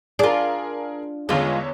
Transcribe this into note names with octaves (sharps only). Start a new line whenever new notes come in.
D4 F4 G#4 A#4
E2 D3 G#3 C#4 F4 C#5